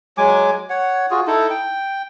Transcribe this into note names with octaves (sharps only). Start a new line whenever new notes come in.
F#3 G#3 G#5 D6
C#5 F#5
F4 F#4 G#4
D#4 E4 A4
G5